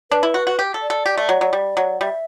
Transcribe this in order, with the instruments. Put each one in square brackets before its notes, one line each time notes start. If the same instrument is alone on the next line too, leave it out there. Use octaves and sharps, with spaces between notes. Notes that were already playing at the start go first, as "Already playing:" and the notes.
[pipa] D4 [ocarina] B4
[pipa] E4
F#4
F#4
G4
A4
[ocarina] D5
[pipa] A4
G4
A3
F#3
F#3
G3
F#3
[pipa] G3 [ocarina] E5